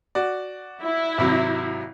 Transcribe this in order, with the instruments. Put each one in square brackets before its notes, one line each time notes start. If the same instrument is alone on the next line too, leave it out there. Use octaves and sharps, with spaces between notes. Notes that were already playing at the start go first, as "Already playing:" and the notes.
[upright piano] F#4 D5
[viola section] E4
[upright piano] G#1 C3 F#3